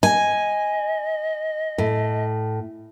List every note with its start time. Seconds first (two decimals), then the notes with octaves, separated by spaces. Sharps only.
0.03 D#5 G#5
1.78 A2